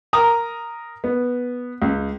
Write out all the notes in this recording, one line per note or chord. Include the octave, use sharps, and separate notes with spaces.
A#4 A#5 D#6
B3
C#2